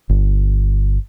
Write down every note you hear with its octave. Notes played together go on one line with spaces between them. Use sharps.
G1